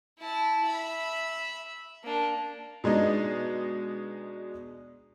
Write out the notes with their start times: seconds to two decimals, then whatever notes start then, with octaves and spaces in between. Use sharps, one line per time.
0.19 E4 A5
0.66 E5 B5
2.03 A#3 D4
2.84 B2 G#3 D4 D#4